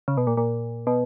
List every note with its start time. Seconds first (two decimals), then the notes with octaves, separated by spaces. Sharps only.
0.08 C#3
0.17 B2
0.27 A#2
0.37 A#2
0.87 B2